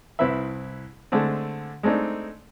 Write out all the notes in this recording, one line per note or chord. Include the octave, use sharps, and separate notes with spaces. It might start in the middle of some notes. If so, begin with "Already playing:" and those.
C2 C4 E4 B4 E5
D3 G#3 A3 C4
G#3 A3 C4 D4 D#4